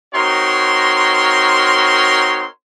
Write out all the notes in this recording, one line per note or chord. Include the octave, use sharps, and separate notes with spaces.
C4 D#4 F#4 A#4 C#5 C6